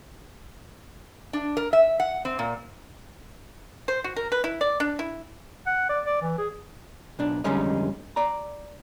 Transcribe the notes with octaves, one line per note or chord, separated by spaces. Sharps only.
D4
A#4
E5
F#5
C4
A#2
C5
F#4
A#4
B4
E4
D5
D4
E4
F#5
D5
D5
E3
G#4
B1 D4
F2 D3 G3 G#3 C#4 D#4
D5 A#5